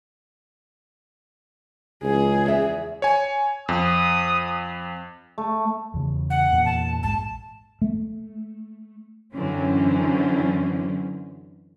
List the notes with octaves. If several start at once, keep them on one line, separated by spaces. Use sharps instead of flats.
C#2 G#4
E2 E5
C#5 G#5
F2 D#6
A3
E2 C#3
F#5
E2 A#2
A5
A#1 G#2 A5
A3
F#2 D3 E3 F#3 C4 C#4